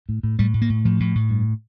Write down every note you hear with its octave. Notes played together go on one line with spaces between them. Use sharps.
A2
A2
A2 G3
A2
A#3
A2
A2 F3
A2
A2
G2